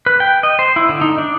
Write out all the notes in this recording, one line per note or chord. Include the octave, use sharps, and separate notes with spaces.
B4
G5
D#5
C5
E4
D3
D#4
D4